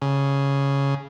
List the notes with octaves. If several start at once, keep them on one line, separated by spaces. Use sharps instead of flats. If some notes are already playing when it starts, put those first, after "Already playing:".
C#3